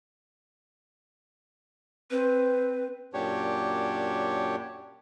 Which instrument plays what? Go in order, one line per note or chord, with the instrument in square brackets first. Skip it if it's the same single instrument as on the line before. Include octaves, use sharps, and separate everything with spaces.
[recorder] C4 [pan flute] B4
[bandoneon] F#2 A#2 D4 G4 C#5